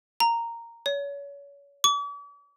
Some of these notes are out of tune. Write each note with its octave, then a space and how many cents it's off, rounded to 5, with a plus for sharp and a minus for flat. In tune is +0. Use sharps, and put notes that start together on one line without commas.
A#5 -10
C#5 +30
D6 -45